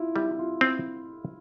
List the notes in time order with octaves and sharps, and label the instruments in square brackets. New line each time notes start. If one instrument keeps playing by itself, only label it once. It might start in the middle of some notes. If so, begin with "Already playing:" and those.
Already playing: [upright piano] E4 F4
[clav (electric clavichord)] G3 [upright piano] E4
[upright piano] E4
F4
[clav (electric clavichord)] C4